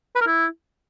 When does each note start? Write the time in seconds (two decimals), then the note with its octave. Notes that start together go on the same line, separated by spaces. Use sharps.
0.16 B4
0.21 A#4
0.27 E4